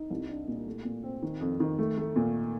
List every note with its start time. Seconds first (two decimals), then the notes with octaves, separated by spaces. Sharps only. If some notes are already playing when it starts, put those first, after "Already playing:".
Already playing: D#4
0.10 C2
0.29 D4
0.48 A#2
0.66 A3
0.85 A#2
1.04 C4
1.23 D#3
1.41 F2
1.60 D#3
1.79 A3
1.98 A3
2.16 A#2